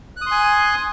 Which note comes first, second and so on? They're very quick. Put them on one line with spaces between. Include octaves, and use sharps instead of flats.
F#6 D#6 C6 G#5